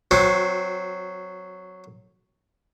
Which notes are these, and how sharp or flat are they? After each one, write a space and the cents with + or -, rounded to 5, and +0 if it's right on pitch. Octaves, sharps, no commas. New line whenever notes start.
F#3 +0 C4 +0 F#4 -30